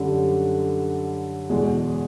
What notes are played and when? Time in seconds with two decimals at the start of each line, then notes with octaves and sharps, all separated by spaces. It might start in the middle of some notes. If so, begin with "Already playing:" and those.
Already playing: F#2 D3 G3
1.49 E2 B2 G#3